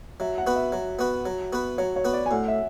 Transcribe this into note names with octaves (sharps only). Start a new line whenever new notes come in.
F#3 E5
F#5
B3 F#4 B4
E5
F#3
B3 F#4 B4
F#3
B3 F#4 B4
F#3 C#5
C#5
B3 F#4 B4
D5
G#5
A2 F#5
E5